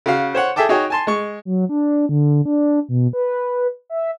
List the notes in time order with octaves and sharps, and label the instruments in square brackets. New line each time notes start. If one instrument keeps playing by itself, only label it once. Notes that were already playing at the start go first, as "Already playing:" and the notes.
[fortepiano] C#3 F#4 F5
C5 C#5 F#5
G#4 A4 E5 G5 A5 D6
D#4 F#4 G#4 C#5 G5
G#5 A5 C6
G#3 C#6
[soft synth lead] F#3
D4
D3
D4
B2
B4
E5